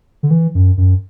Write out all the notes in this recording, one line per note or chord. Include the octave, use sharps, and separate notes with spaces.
D3
E3
F#2
F#2